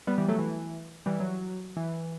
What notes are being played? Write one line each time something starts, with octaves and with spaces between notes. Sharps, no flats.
G3 B3
E3 G3
F#3 A3
E3
E3 G3
F#3
E3